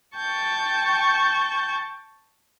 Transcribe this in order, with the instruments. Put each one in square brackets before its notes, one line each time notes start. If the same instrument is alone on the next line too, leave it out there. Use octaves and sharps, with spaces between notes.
[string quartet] G5 A5 C#6 G6